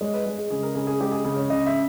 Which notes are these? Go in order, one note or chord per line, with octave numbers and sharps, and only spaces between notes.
G#3 C#5
B4
G#3
G#4
C#3 G#4
A#4
C#3 G#4
G#4
G#3 G4
G#4
C#3 G#4
C#5
C#3 D#5
E5